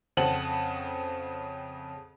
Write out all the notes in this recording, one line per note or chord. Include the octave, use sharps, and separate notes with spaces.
F2 C#3 C4 F#5 A5 F#7